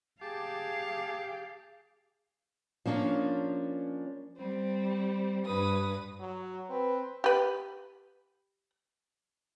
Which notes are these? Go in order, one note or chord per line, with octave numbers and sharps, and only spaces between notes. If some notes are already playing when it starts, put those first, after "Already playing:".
G4 G#4 F5 A5 D6
F3 A#3 C#4 D4
G3 C4
G2 B4 D#6
F#3
C4 B4
G4 B4